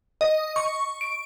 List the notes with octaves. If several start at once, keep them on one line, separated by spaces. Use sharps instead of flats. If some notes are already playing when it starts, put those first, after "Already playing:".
D#5
C#6
D7